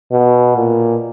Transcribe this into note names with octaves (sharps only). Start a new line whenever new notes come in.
B2
A#2